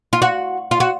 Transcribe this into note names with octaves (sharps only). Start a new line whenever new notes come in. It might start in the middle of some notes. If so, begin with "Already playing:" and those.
F4
F#4
F4
F#4